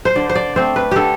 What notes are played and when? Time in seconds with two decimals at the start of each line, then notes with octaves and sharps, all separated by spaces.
0.05 C5
0.15 D3 D5
0.29 C5
0.35 D5
0.56 A3 C4 C5
0.76 B4
0.91 D3 G4 A4